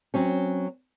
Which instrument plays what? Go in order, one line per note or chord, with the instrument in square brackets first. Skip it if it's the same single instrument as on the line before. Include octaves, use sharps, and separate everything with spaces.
[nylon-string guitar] F#3 C4 C#4